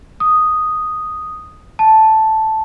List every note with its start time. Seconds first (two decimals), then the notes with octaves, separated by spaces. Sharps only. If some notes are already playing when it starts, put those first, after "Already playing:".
0.20 D#6
1.79 A5